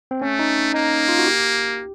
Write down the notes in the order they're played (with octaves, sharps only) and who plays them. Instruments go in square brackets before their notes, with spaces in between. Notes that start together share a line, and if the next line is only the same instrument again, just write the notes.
[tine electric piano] C4
[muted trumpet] A3 [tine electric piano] C#4
[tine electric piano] D#4
[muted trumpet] A#3 [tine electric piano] D#4
[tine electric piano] F4
F#4
G4